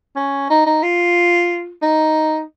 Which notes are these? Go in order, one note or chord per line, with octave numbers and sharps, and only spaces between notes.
C#4
D#4
D#4
F4
D#4